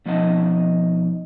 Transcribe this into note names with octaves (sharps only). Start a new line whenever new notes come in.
B2 F3 D#4 D#5 F#5 A5